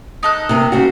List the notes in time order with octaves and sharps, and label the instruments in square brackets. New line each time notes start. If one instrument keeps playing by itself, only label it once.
[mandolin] D#4 A4 F#6
[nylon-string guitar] C3 A#3
C#3 G3 F#4